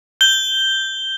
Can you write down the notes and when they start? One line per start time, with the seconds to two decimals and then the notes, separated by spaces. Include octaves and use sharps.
0.21 G6 G7